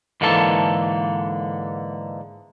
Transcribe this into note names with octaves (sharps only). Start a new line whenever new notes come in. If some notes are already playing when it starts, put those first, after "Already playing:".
G#2 D3 E3 A#3 A4 A5